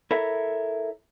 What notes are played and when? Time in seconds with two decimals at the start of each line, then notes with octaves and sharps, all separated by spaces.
0.11 E4 A4 A#4 C#5 E5